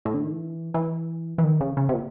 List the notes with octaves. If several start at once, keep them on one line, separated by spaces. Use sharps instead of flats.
A2
D3
D#3
E3
E3
E3
D#3
C#3
C#3
C3
A#2